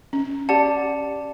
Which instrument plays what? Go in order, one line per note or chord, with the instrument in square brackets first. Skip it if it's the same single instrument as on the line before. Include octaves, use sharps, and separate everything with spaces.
[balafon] C#4
[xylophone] G4 D5 F#5 [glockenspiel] A5